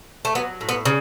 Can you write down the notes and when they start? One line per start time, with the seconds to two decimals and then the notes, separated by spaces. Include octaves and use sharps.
0.25 A3
0.35 F#3 B3
0.61 A2
0.69 B3
0.85 C#3